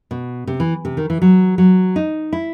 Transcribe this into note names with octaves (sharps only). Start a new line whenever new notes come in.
B2
C3
E3
C3
D#3
E3
F#3
F#3
D#4
E4